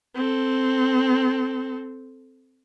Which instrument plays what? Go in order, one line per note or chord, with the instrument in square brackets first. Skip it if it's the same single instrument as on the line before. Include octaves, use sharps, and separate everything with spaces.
[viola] C4 A4